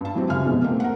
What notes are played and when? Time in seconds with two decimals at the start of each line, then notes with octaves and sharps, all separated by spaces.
0.01 G2 A5
0.15 E3 F#3 G3 C4
0.29 C#2 F#2 E5 F5 G#5 F6
0.45 B1 F2 G#2 B2 G#3
0.64 A3 A#3 C4
0.80 A#4 F#5